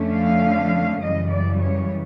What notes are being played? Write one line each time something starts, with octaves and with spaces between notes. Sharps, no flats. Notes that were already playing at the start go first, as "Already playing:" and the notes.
Already playing: F2 D3 F3 A3 C#4
F5
F#2 C#3 E3 G3 D#5
D5
C#5